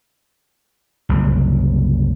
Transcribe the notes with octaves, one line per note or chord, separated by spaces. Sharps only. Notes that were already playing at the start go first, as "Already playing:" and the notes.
F#1 C2